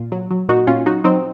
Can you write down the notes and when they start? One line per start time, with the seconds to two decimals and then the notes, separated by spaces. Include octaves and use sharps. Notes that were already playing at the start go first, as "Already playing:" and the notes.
Already playing: A#2 F4
0.12 F#3
0.31 F#3
0.49 A#2 D#4 F#4
0.67 A#2 C#4 F4
0.86 F#3 D#4 F#4
1.04 F#3 C4 D#4